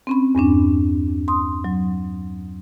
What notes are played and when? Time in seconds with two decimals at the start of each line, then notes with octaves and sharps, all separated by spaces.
0.07 C4 C#4 B5
0.35 E2 G2 C#4 D4
1.28 C6 D#6
1.64 F#3